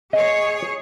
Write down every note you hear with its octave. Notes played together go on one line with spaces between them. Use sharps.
G#4 C#5 D#5